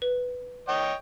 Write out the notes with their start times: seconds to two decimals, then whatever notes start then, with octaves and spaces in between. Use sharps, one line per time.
0.02 B4
0.68 C#5 D#5 G5